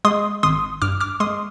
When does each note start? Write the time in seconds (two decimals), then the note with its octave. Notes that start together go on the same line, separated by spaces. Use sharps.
0.05 G#3 C6 D#6
0.43 G#1 C6 D#6
0.82 G2 D6 F6
1.00 D6 F6
1.20 G#3 C6 D#6